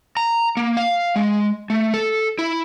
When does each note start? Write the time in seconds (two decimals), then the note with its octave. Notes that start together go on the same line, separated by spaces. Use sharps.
0.17 A#5
0.57 A#3
0.77 F5
1.16 G#3
1.70 A3
1.94 A4
2.39 E4